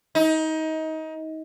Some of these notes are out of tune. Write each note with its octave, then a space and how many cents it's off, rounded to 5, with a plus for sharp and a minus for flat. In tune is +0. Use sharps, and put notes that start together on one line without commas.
D#4 +25